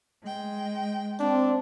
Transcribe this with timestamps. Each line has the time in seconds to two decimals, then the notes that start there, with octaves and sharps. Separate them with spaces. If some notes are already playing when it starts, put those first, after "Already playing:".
0.23 G#3 G5
1.19 C4 D4